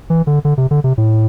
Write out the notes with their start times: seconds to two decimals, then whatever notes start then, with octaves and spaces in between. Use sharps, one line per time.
0.10 E3
0.27 D3
0.45 D3
0.58 C3
0.71 D3
0.84 C3
0.98 A2